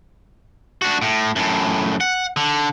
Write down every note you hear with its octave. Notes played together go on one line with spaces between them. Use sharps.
D4 F#4
A2
F#2 A2
F#5
D3